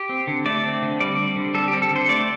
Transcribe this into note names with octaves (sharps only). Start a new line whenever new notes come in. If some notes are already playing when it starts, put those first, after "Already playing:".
Already playing: G4
C4
D3
A3 D5
C4
D3
G3 D5
C4
D3
G3 A4
G4
C4
A4
D3 C5
A3 D5